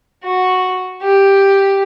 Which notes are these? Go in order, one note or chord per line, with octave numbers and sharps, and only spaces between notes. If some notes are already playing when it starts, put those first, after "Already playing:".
F#4
G4